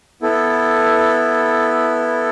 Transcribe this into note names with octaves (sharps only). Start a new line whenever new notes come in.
B3 E4 A4